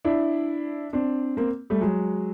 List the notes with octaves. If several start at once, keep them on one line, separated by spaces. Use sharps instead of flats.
D4 E4
C4 D4
A#3 C4
G3 A3
F#3 G#3